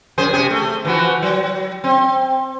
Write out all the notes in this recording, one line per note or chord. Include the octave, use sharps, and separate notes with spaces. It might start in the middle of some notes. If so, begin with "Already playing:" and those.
F#2 G#4 C5
C3 G#4
A3
E3 F3 F#4
F#3
C4